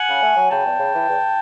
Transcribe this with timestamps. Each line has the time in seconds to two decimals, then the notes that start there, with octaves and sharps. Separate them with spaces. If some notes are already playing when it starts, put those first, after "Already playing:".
Already playing: F#5 G#5
0.09 C#3
0.22 A3
0.36 F#3
0.50 C#3 G5 A5
0.64 E2
0.78 C#3
0.93 E3
1.08 E2